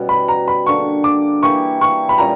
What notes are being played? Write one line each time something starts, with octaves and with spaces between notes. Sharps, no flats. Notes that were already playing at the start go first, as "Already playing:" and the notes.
Already playing: B2 G3 B3 C#4 E4 F#4
B5
A#5
B5
D3 A#3 D4 C#6
D6
E3 A#3 E4 G4 C#6
C#6
B5
A#2 G3 C#4 A#5